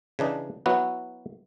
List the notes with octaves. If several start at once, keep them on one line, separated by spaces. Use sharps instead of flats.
C#3 E3 D4 D#4
F#3 B3 E4 F#4